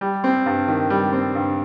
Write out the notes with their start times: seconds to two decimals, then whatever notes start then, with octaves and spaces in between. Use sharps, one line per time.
0.01 G3
0.24 C4
0.46 G2
0.68 D#3
0.90 G3
1.13 C4
1.35 G2